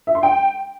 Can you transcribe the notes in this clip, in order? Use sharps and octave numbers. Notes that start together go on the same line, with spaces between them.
E5
C6
G5